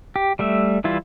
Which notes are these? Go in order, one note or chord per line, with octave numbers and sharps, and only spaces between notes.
G4
G3 A3 E5
E3 G3 E4 F4